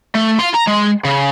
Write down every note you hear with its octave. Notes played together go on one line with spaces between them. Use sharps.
A3
F4 C6
A#5
G#3
C#3